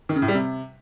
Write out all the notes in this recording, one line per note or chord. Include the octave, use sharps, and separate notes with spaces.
D#3
C#3
A2
G3
C3